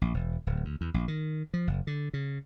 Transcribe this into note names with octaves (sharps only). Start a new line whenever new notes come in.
A#1
E1
D1
D2
E2
A#1
D#3
F3
F#1
D3
C#3